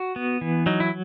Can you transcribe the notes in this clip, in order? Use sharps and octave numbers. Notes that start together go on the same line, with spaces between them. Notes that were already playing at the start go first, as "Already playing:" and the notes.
Already playing: F#4
B3
E3
F#3 D#4
E4